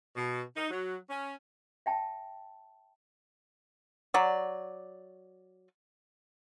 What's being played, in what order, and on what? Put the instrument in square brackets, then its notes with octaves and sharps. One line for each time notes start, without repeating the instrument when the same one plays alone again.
[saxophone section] B2
D#4
F#3
C#4
[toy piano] E5 G5 A5
[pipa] F#3 D5